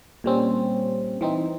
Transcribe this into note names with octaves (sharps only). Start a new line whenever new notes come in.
A#2 G3 C4 C#4
E3 C4 D#4